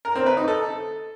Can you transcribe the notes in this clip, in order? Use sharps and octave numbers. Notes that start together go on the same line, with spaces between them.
A#4
C4
B4
D#4
A4